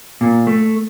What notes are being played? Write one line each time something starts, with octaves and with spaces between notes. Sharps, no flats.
A#2
A3